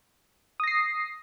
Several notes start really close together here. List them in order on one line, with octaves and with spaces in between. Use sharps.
D#6 A#6 C7